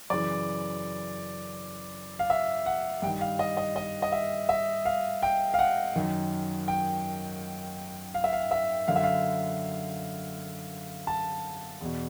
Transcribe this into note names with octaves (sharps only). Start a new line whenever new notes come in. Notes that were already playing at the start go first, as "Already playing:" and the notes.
F#2 C#3 E3 D5
F5
E5
F#5
G2 D#3 G5
F5
D#5
D#5
D#5
D#5
E5
E5
F5
G5
F5
F#5
F#2 D#3
G5
F5
E5
F5
E5
F#2 D3 F5
E5
F5
A5
E2 B2